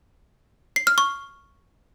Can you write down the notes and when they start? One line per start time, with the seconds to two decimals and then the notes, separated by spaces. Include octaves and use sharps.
0.76 C7
0.87 F6
0.98 C#6